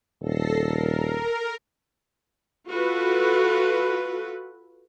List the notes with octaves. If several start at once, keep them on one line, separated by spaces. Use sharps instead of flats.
D#1 A4 A#6 C7
A#4
F4 F#4 A4 B4